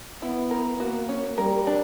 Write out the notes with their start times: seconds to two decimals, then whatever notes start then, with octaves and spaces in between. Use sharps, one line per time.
0.22 B3 E4
0.51 A#4
0.80 A#3 F#4
1.09 C#4
1.38 G3 A#4
1.67 D4